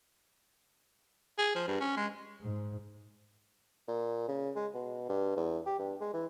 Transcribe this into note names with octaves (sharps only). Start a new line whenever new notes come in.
G#4
F3
G2
C#4
G#3
G#2
A#2
C#3
G#3
B2
G2
E2
G4
G2
G#3
E3